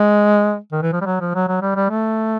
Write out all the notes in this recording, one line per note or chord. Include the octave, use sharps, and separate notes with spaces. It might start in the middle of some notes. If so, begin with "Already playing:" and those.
Already playing: G#3
D#3
E3
F3
G3
F#3
F3
F#3
F#3
G3
G3
A3